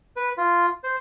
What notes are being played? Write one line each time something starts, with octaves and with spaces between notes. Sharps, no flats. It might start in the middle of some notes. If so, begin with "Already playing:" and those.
B4
F4
C5